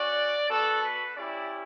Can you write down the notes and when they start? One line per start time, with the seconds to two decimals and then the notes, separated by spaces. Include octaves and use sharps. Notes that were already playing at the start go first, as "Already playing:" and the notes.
Already playing: C#4 F#4 D5
0.50 B3 F#4 A4
0.83 B4
1.16 C#4 E4 G4 D5